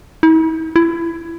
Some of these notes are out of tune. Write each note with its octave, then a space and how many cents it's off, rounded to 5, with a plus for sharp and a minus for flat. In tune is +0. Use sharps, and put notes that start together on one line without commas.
E4 -45
E4 +20